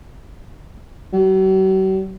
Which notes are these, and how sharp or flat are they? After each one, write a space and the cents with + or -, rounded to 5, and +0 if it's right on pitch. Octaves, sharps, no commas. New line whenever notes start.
F#3 +45